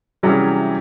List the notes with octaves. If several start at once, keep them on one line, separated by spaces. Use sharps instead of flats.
C3 E3 F#3 G3 C#4 G#4